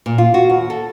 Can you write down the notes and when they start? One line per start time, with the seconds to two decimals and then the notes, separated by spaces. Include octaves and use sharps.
0.06 A#2
0.18 F4
0.34 F#4
0.50 D#2
0.70 A4